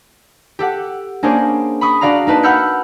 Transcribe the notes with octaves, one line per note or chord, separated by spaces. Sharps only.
G4 A4 F#5
A#3 C#4 D4 G#4 C5
B5 C#6 D#6
D4 F#4 D5 F5 A#5
A#3 D#4 B4 A5
F#5 B5 E6 F6 G6 C#7